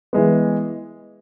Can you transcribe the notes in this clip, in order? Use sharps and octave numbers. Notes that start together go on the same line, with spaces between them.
E3 G#3 B3